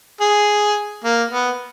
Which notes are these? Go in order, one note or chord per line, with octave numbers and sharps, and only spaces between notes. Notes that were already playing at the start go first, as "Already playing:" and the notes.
G#4
A#3
B3